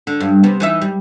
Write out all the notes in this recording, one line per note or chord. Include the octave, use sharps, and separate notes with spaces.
D3
G2
C3 B3
E3 D#4 E5
G3